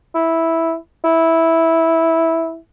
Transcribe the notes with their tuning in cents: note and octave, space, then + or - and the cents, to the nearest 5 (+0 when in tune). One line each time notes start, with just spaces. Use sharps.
E4 -5
E4 -10